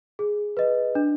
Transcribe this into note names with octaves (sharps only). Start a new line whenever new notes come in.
G#4
B4 D#5
D4